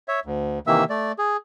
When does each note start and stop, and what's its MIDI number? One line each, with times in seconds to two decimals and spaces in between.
0.08 0.20 73
0.08 0.20 76
0.26 0.59 38
0.67 0.84 48
0.67 0.84 51
0.67 0.84 52
0.67 0.84 58
0.67 0.84 76
0.67 0.84 88
0.90 1.12 57
0.90 1.12 74
1.19 1.37 68